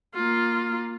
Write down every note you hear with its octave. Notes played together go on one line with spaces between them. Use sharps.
A#3 F4